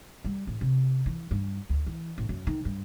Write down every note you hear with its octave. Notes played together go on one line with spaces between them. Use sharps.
G3
A1
C3
E3
G2
D2
E3
A1
F#2
D#3
G2